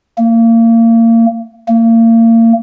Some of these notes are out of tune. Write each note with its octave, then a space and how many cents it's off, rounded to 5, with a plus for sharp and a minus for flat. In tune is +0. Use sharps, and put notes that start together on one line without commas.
A#3 -30
A#3 -35